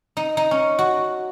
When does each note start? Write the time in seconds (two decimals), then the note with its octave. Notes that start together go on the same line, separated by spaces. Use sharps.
0.17 D#4
0.37 D#4
0.51 C#4
0.79 F#4